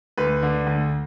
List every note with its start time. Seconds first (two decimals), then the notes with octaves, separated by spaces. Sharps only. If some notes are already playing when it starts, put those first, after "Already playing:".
0.17 D2 B4
0.42 D3
0.67 D2